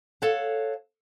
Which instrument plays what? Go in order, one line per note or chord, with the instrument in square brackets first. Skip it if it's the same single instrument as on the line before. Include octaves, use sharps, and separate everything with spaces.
[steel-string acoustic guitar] A4 C#5 F5 F#5